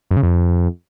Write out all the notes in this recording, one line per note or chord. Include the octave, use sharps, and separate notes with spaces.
F#2
C#3
F2